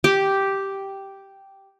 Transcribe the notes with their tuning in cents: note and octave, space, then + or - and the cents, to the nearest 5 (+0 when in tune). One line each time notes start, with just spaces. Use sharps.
G4 -5